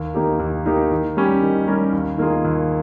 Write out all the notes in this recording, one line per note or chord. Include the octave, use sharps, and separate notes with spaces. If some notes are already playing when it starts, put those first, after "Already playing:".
Already playing: D#2
D#3 A#3 D#4 G4
D#2
D#3 A#3 D#4 G4
D#3
G3 C#4 G4 A#4
D#3
G3 C#4 G4 A#4
D#2
D#3 A#3 F4 G#4
D#2